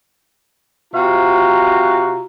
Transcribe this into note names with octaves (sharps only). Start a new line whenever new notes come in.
C3 F4 F#4 F5 A#5